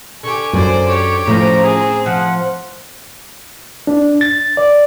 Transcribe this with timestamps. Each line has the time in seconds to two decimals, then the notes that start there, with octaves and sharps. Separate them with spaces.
0.23 D3 G4 G#5 C#6
0.53 F#2 C5 D5
0.88 G4 C#5
1.27 A2 F3 C#4 C5 A#5
1.63 C4 G#4
2.06 F3 F#5
3.87 D4
4.21 A6
4.57 D5